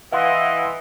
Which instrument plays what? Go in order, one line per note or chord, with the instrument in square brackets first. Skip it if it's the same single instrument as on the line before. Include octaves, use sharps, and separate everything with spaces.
[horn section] E3 [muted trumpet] D#5 [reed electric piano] F5 F#5 C6